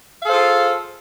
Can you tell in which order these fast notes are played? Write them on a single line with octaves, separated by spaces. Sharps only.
F5 A4 C5 G#4 F4